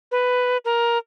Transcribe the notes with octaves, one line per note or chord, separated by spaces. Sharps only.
B4
A#4